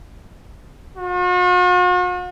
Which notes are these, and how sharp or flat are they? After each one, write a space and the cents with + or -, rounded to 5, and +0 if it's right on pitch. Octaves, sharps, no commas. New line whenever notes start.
F#4 -45